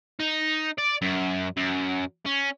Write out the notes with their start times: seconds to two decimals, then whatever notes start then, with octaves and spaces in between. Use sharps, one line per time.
0.20 D#4
0.78 D5
1.02 F#2
1.57 F#2
2.26 C#4